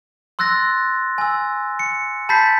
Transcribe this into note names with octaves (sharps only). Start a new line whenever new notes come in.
C6 E6 F#6 A6 A#6
G#5 E6
C#7
A5 B5 G6 A6 B6 C7